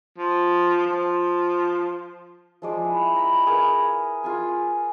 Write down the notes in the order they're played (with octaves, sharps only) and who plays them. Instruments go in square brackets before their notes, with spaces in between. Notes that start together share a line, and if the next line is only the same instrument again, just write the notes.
[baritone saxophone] F3
F3
[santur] F3 G#3 D5
E4
A#5 B5
G#4 A#4 B4
F4 G#4 G#5